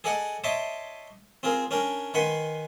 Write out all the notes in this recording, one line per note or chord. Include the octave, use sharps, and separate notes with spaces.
G#4 A4 D5 D#5 F#5
C#5 D#5 E5 A5 C6 D6
C4 F4 G#4 A#4
C#4 D4 A#4 G5
D#3 B4 F#5 G#5 C6